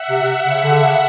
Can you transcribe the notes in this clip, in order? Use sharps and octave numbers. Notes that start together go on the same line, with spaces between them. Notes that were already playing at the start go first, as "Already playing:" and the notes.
Already playing: E5 F#5
C3
C3
C#3
D3
C#3